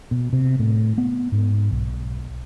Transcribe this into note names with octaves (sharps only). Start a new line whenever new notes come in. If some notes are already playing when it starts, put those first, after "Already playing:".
B2
C3
A2
B3
G#2
B1